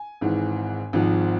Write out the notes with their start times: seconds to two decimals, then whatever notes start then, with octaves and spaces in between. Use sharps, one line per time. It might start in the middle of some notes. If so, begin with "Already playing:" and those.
Already playing: G#5
0.21 G#1 G#2 E3
0.93 G#1 G#2 F3